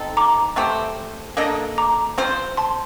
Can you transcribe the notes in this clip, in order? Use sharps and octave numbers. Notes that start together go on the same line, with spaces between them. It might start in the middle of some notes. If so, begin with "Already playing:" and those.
Already playing: C4 D#4 A4
A#5 D6
A3 C4 G4 C5
A#3 D4 A4 D#5
A#5 D6
C4 F4 C5
A5 C6